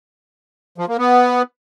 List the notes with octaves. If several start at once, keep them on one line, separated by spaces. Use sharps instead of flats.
F3
A#3
B3